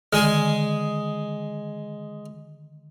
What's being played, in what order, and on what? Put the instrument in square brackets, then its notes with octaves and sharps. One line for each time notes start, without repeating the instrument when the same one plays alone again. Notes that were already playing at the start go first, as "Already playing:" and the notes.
[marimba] D3 D#3 [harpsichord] G#3 G#4